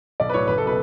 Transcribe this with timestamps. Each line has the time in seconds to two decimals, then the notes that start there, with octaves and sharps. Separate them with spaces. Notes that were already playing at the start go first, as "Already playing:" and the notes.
0.20 B1 D5
0.29 B4
0.33 A2 F#3 C#5
0.48 F#1 B4
0.58 A4
0.66 B2 B4